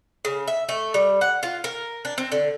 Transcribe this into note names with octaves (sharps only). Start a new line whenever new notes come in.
C#3
E5
A3
G3
F#5
F4
A#4
D4
C4
D3